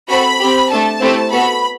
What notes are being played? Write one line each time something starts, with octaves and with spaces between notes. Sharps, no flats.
C4 F#4 A4 B5
C4 G4
A3 D4 A4 A5
A3 C4 E4 G4
B3 F#4 A4 B5